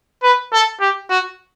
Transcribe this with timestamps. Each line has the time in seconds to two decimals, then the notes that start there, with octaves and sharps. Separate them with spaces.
0.23 B4
0.53 A4
0.81 G4
1.10 F#4